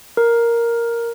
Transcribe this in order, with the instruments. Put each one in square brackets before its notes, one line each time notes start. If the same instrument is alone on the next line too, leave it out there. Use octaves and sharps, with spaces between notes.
[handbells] A#4